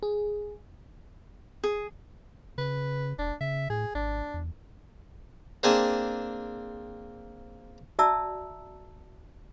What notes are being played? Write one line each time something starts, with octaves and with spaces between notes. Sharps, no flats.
G#4
G#4
C#3 B4
E1 D4
C#3 E5
A2 G#4
G#1 D4
E2
A#3 C4 D4 G#4 G#5 A5
F#4 D5 E5 A5 A#5 E6